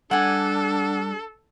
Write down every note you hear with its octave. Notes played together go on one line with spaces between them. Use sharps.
G3 D4 A4 F#5 G#5